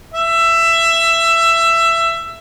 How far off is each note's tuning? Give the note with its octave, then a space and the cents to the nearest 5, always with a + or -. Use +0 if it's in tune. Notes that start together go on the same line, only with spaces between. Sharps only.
E5 +15